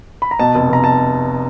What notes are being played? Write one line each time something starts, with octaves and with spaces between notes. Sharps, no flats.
B5
A#5
B2 A5
F1
F1 A#5
A5